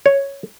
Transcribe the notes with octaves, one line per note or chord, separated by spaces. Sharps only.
C#5